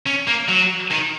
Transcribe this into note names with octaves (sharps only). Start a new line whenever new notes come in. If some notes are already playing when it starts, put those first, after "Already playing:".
C#4
A#3
F#3
D#3